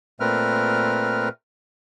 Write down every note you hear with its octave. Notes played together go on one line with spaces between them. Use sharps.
A#2 A3 C4 A#4 B4 F6